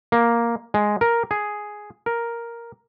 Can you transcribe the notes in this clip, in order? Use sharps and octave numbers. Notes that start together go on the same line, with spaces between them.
A#3
G#3
A#4
G#4
A#4